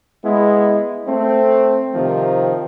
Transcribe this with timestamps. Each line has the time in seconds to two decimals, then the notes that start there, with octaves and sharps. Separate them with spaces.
0.22 G#3 B3 E4
1.07 A3 C4
1.95 C3 D#3 F3